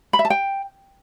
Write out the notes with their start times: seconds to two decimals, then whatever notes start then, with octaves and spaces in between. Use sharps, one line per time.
0.13 B5
0.19 E5
0.25 A5
0.30 G5